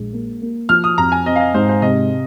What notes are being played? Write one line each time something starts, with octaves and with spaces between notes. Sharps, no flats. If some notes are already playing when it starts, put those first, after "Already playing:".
Already playing: A#1 G#3
A#3
A#3
F3 F6
D#6
F2 A#5
G#5
C4 D#5
F5
D#5
G#2 C5
C5
C3 D#5